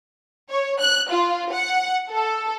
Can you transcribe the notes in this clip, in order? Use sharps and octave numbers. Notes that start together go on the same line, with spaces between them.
C#5
F#6
F4
F#5
A4